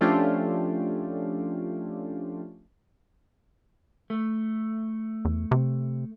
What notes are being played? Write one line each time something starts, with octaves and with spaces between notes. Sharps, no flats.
F3 A3 C#4 D4 F4 G4
A3
E2
C3